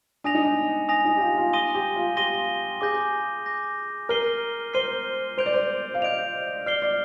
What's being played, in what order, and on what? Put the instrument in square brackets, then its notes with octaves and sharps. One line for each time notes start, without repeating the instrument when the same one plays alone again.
[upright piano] D4 [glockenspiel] G#5 D#6 A#6 F7
[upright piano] D#4
D4
[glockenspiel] G#5 D#6 A#6 F7
[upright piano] D#4
G4
F4
F4
[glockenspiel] C6 D#6 A#6 D#7 G7
[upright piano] G4
F4
[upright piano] G4 [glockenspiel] C6 D#6 A#6 D#7 G7
[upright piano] G#4 [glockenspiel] D6 G6 A#6
[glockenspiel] D6 G6 A#6
[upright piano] A#4 [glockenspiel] F6 C7 D#7 G7
[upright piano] C5 [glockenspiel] F6 C7 D#7 G7
[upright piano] C5 [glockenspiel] G6 D7 F7
[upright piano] D5
C5
F5
[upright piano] D#5 [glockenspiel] G6 D7 F7
[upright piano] D5 [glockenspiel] F6 C7 G7
[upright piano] D5